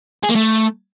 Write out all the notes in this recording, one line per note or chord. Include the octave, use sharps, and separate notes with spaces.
G#4
A#3
A3